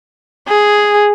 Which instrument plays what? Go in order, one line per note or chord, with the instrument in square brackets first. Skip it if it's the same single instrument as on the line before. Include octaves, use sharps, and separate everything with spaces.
[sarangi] G#4